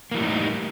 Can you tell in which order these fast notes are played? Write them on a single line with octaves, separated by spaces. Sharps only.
A#3 E3 G3 A2 D#4